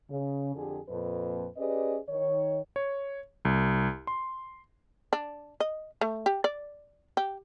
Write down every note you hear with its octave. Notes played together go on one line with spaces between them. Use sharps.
C#3
F2 D3 G4 G#4
F2 A#2 B4
C#4 G4 G#4 B4 D5 D#5
D#3 C#5
C#5
C2
C6
D4
D#5
A3
G4
D5
G4